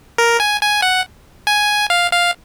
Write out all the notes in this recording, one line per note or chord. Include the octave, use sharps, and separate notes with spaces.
A#4
G#5
G#5
F#5
G#5
F5
F5